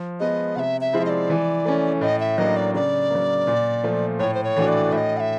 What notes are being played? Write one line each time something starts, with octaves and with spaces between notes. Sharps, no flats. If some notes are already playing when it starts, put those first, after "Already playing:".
Already playing: F3
G#3 B3 D#5
C3 E5 F#5
E5
F3 G#3 C4 E4
D#5
D5
E3
A3 C#4
A2 D#5
E5
F#3 A#3 D4 D#5
D5
C#3 D5
F#3 A#3
A#2
F3 A3
A2 C#5
C5
C#5
E3 A3 D4 F#4
D5
A2 D#5 E5
F#5
E5